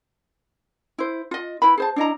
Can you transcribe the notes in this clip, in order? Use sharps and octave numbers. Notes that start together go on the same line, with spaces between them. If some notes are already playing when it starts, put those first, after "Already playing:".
E4 C5
F4 D#5
E4 B4 B5
G#4 C5 A5
D4 E4 D#5 A#5